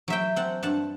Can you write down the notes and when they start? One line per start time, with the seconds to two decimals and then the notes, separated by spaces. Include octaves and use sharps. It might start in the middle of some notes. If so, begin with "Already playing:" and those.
0.08 F#3 E5 G5
0.36 C4 F#5 A5
0.62 G2 F#5 A5